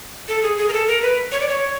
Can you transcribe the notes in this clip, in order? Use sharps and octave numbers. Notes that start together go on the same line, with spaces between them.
A4
G#4
G#4
A#4
A4
A#4
B4
C#5
D5
C#5